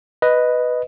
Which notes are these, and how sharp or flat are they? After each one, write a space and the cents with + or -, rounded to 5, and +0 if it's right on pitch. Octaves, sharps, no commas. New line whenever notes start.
B4 +0 D#5 +0